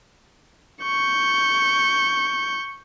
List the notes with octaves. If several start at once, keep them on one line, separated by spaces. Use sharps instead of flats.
C#6 G6